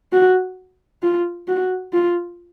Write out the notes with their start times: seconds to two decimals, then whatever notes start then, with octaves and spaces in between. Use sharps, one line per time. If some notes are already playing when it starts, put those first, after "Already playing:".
0.13 F#4
1.03 F4
1.48 F#4
1.93 F4